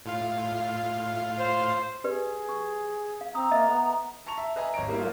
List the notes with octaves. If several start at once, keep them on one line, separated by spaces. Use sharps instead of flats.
A2 F4 F5
C5
G4 G#4 B4 D5
C#6
F5
C4 A#5 D#6
A#3 D#5 E5
B3 A4
A5 A#5 C#6 F7
E5
B4 D#5 E5 G#5 A#5
G#1 C#5 D#5 A#5 D7
G3 A#3 E4
F#3 A3 A#3 F4